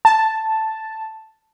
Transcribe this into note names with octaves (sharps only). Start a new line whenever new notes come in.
A5